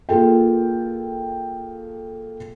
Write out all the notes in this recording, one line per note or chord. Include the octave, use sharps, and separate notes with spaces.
A#3 F4 G#4 A4 G5